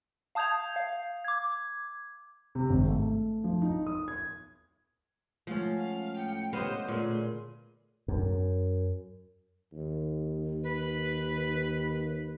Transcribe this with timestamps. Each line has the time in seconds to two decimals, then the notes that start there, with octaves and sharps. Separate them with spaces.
0.35 F5 A5 D#6 G6 G#6 F7
0.76 F5
1.25 D6 G#6
2.55 C3
2.70 G#1
2.86 A3
3.44 F3
3.62 D#4
3.87 D#6
4.08 G#6
5.47 F3 G#3 A3 C#4 F#5
5.79 F5
6.17 A2 G5 C#7
6.53 D3 B3 G4 C5 C#5 D#5 F5
6.88 A#2 A3 G#4 B4 C6
8.08 F#2
9.73 D#2
10.63 B4